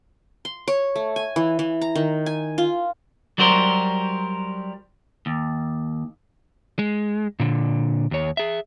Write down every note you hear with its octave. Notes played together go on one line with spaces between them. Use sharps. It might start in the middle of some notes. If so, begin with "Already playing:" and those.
C6
C#5
A3
G#5
E3
E3
A#5
D#3
G#5
F4
F#3 G3 F#4 A#4 C5
D#2
G#3
A#2 D3
D#2 C#5
G#4 E5